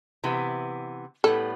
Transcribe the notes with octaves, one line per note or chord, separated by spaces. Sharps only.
C3 E3 B3
A2 G3 B3 A4